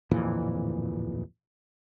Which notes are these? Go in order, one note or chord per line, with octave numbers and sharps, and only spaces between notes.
D1 F2 A#2 E3